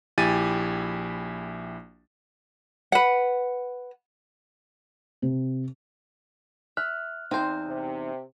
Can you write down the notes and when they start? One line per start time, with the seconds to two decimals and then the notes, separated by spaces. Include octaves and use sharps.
0.18 A#1 E4 G4 G#5 A6 D#7
2.92 B4 F#5
5.22 C3
6.77 E5 F6 F#6
7.31 E2 C4 D#4 C5
7.67 C3